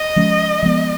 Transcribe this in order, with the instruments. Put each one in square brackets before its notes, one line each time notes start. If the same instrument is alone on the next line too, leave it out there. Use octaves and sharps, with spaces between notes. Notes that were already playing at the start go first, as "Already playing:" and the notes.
Already playing: [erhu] D#5
[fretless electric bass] F3 G#3 C#4
F3 G#3 B3